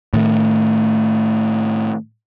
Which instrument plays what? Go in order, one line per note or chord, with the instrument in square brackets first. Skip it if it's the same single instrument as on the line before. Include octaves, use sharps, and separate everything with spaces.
[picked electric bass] A2 D#3 A3